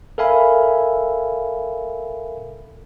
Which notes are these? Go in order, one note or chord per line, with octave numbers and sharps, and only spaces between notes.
A4 A#4 E5 F5 G#5 B5